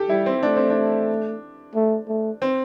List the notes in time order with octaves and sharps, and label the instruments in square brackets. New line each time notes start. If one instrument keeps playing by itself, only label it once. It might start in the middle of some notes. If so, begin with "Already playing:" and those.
Already playing: [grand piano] G4 A4
[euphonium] G3 [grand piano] E4
[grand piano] C4
[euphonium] A3 [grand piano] D4
[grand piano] C4
D4
[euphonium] A3
A3
[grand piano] C4